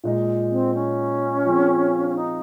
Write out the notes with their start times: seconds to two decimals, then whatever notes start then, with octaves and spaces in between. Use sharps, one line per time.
0.04 A#2 G#3 D#4
0.50 C4
0.74 C#4
1.45 F3 C4 F4 G#4
2.09 C#4
2.16 D#4